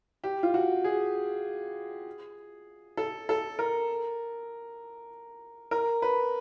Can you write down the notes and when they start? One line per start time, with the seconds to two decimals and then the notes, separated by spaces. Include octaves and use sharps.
0.24 G4
0.43 F4
0.54 F#4
0.84 G#4
2.97 A4
3.29 A4
3.59 A#4
5.71 A#4
6.02 B4